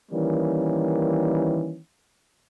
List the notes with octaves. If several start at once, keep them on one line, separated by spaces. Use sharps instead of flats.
D#3 E3 G3 A#3 C#4